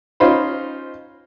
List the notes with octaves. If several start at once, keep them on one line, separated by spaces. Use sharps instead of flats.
C#4 D#4 F4 C5 B5